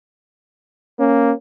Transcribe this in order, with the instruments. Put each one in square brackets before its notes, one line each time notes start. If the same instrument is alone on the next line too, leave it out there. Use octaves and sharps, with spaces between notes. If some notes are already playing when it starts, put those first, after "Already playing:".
[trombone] A#3 [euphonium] C#4